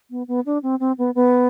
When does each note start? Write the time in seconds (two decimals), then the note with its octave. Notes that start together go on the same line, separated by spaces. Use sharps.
0.10 B3
0.28 B3
0.46 D4
0.63 C4
0.80 C4
0.98 B3
1.15 B3